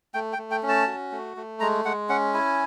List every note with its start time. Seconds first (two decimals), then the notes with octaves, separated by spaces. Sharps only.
0.14 A3 G5
0.33 G5
0.38 A3
0.51 G5
0.63 C#4
0.69 A5
0.87 F#4
1.12 A3
1.37 A3
1.60 G#3 A#5
1.85 G#3 F#5
2.09 C#4 F#5
2.34 E4 G#5